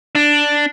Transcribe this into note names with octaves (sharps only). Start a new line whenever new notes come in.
D4